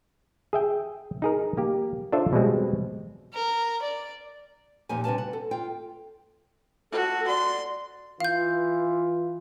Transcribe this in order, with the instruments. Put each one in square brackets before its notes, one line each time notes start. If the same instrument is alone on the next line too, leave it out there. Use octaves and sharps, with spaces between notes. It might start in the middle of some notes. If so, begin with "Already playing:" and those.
[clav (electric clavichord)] G#4 E5 G5
D#4 G#4 A#4
A#3 G4
D4 F4 A4 C5 E5
B2 G3 G#3 C4
[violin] A#4
D5
[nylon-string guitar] E2 A#2 F3 D#4 G4 G#5
C3 G3 D4 B4 G#5 A5
F#5
A4
F4 G5
[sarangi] F#4 [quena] A4
[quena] D5 [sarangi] C6
[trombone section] E3 F4 [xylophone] F5 G6